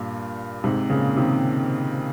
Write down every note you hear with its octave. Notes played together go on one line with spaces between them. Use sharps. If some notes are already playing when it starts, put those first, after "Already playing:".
Already playing: G2 A#2
G#2 C3
A#2 C#3
C3 D#3